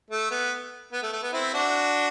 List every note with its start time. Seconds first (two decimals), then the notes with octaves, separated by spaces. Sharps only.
0.11 A3
0.31 B3
0.92 B3
1.03 A3
1.13 A3
1.23 B3
1.33 C4 E4
1.54 D4 F#4